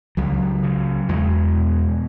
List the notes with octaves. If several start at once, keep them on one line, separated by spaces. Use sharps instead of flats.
C#2 F#3
C#3
E2 G#3
B2